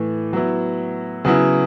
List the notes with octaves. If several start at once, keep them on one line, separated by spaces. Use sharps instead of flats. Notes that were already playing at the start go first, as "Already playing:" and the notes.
Already playing: A2 E3 A3
F#3 B3 E4
C#3 F#3 B3 E4